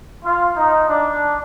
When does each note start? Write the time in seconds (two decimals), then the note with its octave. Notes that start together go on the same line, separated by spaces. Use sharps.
0.25 F4
0.56 D#4
0.88 D4